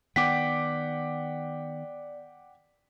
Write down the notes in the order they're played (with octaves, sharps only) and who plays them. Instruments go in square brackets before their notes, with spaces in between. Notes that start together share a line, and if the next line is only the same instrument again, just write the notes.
[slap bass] D#3 B3 [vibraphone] D5 [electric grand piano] F#5 G5 D6 [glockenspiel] B6